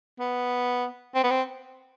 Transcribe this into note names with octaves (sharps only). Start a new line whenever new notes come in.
B3
C4
B3
C4